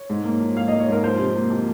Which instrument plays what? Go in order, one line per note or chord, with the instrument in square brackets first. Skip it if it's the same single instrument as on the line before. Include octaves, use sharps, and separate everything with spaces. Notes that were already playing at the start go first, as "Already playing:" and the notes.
Already playing: [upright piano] C#5
G#2
A#3
F3
G#2 F5
D#5
A#3
C#5
G#2 A#4
F3 C5
C3
A#3
F3